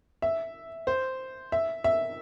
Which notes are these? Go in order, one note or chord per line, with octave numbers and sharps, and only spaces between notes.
E5
C5
E5
E5